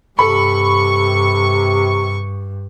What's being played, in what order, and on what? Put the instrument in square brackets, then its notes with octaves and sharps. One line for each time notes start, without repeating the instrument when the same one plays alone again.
[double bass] G2 [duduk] C3 [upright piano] A4 B5 [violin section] C#6